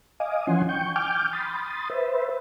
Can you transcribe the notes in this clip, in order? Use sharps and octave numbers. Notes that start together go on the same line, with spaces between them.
D#5 F5 G#5 D6 D#6
E3 F3 C#4 F#5 G#5 C6
G5 C#6 G6
G5 G#5 D6 F6 G6
B5 C6 D#6 A6
B4 C5 E5